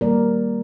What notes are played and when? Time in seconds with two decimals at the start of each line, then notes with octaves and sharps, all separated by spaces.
0.01 D#3 G3 A#3 A#4 D5